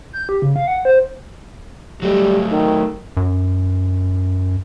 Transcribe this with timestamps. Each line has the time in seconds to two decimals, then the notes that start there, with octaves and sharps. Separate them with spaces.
0.13 G6
0.29 G4
0.42 C#3
0.56 F5
0.67 F#5
0.85 C5
2.02 F#3 G3 A3
2.52 D#3
3.17 F#2